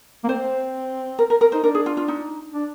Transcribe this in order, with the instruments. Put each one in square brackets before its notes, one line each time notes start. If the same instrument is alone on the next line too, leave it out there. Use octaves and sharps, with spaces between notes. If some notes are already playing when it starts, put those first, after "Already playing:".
[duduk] A#3
[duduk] C4 [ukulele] C5
[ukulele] A#4
A#4
A#4
[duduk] D#4 [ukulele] C5
[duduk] D4 [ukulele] A#4
[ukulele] G#4
F4
F4
D#4
[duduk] D4